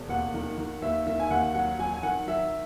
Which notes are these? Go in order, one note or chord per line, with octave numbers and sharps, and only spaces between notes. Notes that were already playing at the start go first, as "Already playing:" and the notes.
Already playing: E1
D#2 F#5
D#3
D#3
D#2 E5
D#3 E5
G#5
D#2 F#5
F#3 F#5
F#3 G#5
G#5
D#3 F#5
F#3 E5